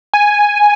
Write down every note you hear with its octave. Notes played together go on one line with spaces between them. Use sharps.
G#5